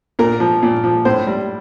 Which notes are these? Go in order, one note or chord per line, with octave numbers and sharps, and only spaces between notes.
A#2 A#4
F3
A#2
F3
A2 C5
G3